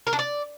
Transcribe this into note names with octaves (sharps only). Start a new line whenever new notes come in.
A#4
D4
D5